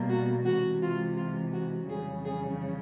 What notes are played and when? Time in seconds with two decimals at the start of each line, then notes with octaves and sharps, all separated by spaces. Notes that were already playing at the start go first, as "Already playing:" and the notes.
Already playing: B2 G3 A#3
0.09 F#4
0.45 C3 E3 G#3 F#4
0.82 F4
1.16 F4
1.53 F#4
1.88 F2 C#3 E3 G3 G#4
2.24 G#4